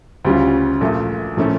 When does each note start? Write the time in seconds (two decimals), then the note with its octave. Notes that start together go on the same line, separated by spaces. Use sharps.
0.25 D2 C#3 G3 C#4 F4
0.81 A#1 A#2 A3
1.37 A#2 F3 A3 C#4 E4